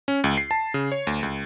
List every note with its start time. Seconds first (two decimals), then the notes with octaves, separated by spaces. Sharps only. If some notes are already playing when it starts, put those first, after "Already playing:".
0.08 C#4
0.24 C#2
0.38 C7
0.51 A5
0.74 C#3
0.92 C#5
1.07 D2
1.23 C#2